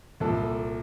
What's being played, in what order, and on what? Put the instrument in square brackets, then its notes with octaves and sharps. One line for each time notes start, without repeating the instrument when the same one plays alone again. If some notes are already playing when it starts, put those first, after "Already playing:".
[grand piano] C2 A#2 A4